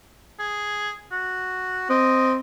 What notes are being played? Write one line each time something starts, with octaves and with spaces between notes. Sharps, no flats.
G#4
F#4
C4 D#5